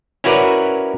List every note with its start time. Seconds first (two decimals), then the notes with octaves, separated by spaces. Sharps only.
0.24 C#4 E4 F#4 A#4 B4 D5